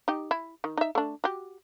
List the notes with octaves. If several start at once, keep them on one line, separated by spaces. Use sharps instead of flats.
D#4 G4
E4
D#3
D#4 E5
A3 D4
F#4 G4